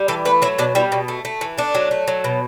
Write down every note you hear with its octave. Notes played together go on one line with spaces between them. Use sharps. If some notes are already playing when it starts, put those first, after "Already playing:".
Already playing: G3
E3 A4
A3 B4
F#3 E4
B2 D4
G3 E4
B2
A3
A3
E3
A3 D4
F#3
A3
F#3
B2